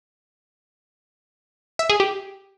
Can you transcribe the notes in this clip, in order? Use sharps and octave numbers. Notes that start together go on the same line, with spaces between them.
E5
G#4
G4